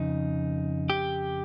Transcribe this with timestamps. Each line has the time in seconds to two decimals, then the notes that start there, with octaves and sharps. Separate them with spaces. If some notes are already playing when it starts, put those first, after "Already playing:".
Already playing: F2 C#3 D#4
0.90 G4